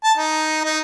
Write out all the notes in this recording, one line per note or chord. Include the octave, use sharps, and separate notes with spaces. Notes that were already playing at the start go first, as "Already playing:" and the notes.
A5
D#4
D#4